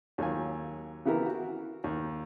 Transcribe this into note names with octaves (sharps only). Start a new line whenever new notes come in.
D#2 F#3 F4 G#5
C#3 E3 B3 E4 G4 A#4
F#4
D#2